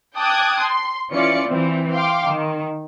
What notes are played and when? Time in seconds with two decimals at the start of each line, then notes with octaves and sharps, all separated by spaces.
0.17 G5 A5 D6 D#6 F#6 G#6
0.61 C6
1.13 E3 C#4 F4 D5 C#7
1.48 E3 C4
1.93 F5 G5 C6 D6
2.25 D#3